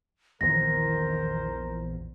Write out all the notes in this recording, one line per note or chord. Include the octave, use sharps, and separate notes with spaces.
A#1 E2 D#3 A#4 C5 A#6